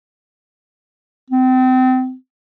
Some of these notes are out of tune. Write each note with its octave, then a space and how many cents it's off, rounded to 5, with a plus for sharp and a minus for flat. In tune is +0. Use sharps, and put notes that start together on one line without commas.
C4 -30